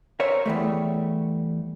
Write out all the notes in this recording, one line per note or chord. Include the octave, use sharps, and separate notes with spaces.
A#4 C5 C#5 E5
E2 E3 G3 A3